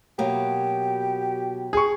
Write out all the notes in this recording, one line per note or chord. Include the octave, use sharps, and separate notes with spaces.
B2 F#3 A#3 G4
G#4 C#6